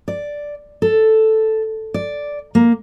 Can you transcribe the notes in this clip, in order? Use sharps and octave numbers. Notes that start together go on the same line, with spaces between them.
D5
A4
D5
A#3